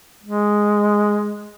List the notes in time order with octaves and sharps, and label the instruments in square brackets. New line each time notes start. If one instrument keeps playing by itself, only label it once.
[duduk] G#3